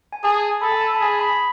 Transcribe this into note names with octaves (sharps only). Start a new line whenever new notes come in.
G#5
G#4 A5
A4 B5
G#5
A5
B5
G#4 A5
B5